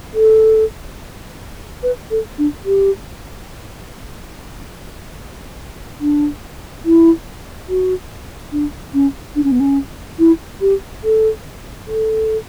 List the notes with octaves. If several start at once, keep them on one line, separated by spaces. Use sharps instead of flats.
A4
B4
A4
D4
G4
D4
E4
F#4
D4
C#4
D4
C#4
B3
C#4
E4
G4
A4
A4